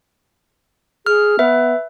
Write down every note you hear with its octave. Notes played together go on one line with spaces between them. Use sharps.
G#4 F6
B3 B4 E5